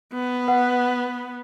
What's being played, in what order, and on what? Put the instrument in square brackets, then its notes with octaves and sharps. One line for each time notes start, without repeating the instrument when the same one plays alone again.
[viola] B3
[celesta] B4 F#5